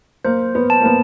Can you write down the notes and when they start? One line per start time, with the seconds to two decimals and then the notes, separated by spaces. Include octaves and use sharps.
0.25 A#3 C5
0.55 B3
0.70 A5
0.81 A#3
0.85 B3